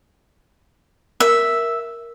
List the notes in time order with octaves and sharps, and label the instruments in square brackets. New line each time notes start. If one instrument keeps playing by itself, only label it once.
[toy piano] A#4 [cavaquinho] E5